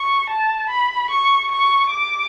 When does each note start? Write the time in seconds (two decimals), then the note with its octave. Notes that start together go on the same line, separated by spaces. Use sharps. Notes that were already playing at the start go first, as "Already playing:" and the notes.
Already playing: C#6
0.30 A5
0.70 B5
1.11 C#6
1.52 C#6
1.91 D6